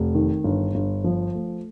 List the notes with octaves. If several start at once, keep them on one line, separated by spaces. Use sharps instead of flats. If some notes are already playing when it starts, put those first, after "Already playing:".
Already playing: F1
D#3
G1
G1
F3
A3